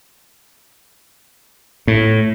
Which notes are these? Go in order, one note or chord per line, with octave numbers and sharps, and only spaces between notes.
A2